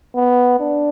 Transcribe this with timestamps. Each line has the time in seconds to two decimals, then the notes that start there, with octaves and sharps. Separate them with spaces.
0.16 B3
0.60 D4